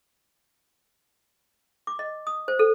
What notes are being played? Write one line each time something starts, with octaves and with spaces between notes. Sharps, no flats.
D6
D#5
D#6
C5
A4